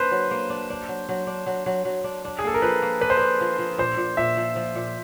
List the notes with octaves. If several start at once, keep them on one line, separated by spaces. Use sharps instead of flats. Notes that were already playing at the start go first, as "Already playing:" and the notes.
Already playing: A#3 D4 B4 C5
F#3
A#3
D4
D4
F#3
F#3
D4
F#3
F#3
F#3
D4
D4
G#4
A#3 A4
A#4
F3 B4
A#3
D4 B4
C5
D4 B4
F3
F3
A#2 C5
A#2
A#2 E5
F3
F3
A#2